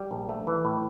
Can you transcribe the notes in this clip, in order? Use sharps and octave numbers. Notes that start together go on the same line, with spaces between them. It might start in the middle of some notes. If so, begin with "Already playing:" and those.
Already playing: G3
A#1
A3
E3
A2